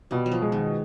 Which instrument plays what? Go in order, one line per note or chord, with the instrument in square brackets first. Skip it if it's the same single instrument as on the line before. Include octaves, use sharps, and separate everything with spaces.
[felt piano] B2 [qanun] G3
[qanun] F#3
F3
[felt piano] G#3
[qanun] D#3